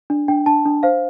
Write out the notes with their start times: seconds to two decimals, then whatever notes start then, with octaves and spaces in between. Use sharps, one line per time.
0.10 D4
0.28 D4 G5
0.46 D4 A5
0.65 D4
0.83 C5 F5